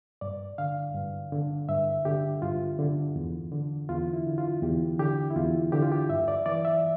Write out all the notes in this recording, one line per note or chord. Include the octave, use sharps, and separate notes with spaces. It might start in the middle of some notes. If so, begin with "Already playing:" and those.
G2 D5
D3 F5
G2
D3
G2 E5
D3 G4
G2 F4
D3
E2
D3
E2 F4
E4
D3
F4
E2 G4
D3 G4
E4
E2 F4
D3 G4
F4
G4
G2 E5
D5
E3 D5
E5